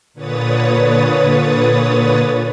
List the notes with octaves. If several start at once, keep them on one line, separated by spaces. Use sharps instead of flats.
A#2 D3 B4 C#5 D#6 A6